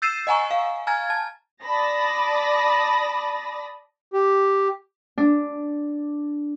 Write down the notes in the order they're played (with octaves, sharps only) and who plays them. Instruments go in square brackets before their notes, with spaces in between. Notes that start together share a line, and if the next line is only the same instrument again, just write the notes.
[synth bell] E6 G6 A6 C7 D#7 E7
D#5 F#5 G#5 A#5 C#6
F5
G#5 A#5 F6 G#6 A6
A5
[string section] D5 A5 B5 D#6 A6 A#6
[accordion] G4
[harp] D4